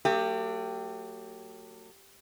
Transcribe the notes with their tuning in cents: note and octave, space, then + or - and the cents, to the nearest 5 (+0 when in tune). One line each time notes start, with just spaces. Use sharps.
F#3 +0 A3 +45 G4 +0